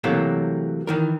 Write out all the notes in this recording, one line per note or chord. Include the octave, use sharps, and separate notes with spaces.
C3 E3 F#3 A3 A#3
D#3 E3 A#4